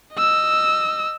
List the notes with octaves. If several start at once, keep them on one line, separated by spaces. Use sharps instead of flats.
D#5 E6